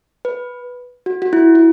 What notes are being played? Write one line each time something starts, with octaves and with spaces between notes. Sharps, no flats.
B4
F#4
F#4
E4
E4